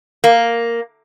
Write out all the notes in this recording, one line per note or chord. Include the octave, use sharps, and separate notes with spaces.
A#3